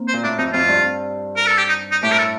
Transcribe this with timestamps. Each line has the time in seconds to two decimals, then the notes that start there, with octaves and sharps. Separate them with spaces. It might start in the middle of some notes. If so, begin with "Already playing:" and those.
Already playing: A#3 C4
0.08 C5
0.13 A#2
0.24 A2 D4
0.38 F2 D#4
0.53 F2 F4
0.68 G2
1.36 A#4
1.47 A4
1.58 G4
1.69 D#4
1.92 D#4
2.03 A2 G4
2.11 A#4
2.18 A4